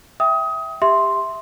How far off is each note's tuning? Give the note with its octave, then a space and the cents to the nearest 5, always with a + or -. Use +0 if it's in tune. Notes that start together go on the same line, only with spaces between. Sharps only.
E5 +0 G5 +0 D#6 +25
G4 +15 E5 +0 C6 +0